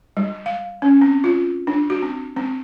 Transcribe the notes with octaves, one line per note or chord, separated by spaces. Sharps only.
G3
F5
C#4
C4
F4
D4
F#4
C4
C4